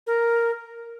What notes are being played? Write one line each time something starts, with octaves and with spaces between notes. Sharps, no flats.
A#4